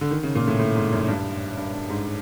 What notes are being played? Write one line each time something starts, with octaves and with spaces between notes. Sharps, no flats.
D3
D#3
C#3
A#2
A2
A2
G#2
F#2
G2
G2
G2
G#2